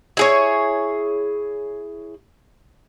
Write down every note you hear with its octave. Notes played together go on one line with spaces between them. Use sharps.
E4 G#4 C#5